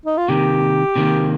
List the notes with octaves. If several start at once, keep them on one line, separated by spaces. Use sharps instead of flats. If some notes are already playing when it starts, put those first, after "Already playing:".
D#4
F4
C3 D#3 A#3 G4
C3 D#3 A#3